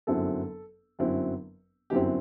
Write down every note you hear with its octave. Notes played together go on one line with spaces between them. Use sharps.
G1 F#2 F#3 C4 E4 A4
G1 F#2 F#3 C4 E4
G1 F#2 F#3 C4 E4 G4